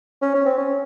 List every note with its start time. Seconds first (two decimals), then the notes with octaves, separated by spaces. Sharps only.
0.22 C#4
0.35 C#4
0.46 C4
0.58 C#4